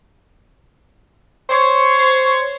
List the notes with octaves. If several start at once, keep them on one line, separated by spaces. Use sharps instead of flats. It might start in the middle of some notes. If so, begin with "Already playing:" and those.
C5 C#5